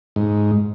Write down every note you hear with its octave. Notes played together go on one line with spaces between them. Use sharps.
G#2